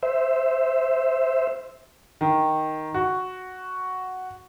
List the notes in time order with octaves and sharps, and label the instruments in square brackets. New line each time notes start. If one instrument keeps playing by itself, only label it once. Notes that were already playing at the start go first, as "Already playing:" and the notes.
[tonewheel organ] C5 E5
[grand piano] D#3
F#4